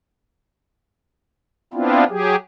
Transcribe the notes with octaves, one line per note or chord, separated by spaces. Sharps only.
B3 C4 D4 E4 F4
F#3 G4 G#4